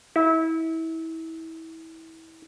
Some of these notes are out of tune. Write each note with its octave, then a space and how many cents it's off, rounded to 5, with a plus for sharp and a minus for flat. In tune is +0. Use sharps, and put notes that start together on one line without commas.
E4 -25